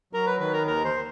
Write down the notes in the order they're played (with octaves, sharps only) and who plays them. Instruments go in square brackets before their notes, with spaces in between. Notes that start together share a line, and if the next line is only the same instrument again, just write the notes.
[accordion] F#3 [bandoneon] A#4
[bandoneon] B4
[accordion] D#3 [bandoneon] B4
[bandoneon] A#4
[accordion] D#2 [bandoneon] A#4
[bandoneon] C5